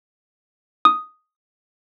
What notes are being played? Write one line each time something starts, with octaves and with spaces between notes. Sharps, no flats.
D#6